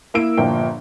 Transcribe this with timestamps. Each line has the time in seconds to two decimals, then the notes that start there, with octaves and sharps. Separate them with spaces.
0.14 A#3 E4 A#4 E6 D7
0.37 G1 A#2 F3 G5